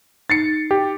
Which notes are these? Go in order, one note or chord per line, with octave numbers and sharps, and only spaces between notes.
D#4 A6 C7 C#7
G4